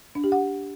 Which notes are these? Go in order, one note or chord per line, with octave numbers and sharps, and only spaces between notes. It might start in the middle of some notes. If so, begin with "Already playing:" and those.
D4
G4
F#5